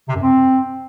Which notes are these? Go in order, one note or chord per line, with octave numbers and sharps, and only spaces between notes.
C3
F#2
C4